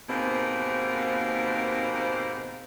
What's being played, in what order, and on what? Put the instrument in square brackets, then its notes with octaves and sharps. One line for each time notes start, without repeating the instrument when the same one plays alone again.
[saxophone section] D#2 G#2 B2 A#3 C4